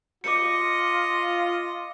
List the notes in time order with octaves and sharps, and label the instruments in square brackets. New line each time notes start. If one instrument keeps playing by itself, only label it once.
[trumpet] F4 [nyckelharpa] D#5 [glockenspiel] D6 C#7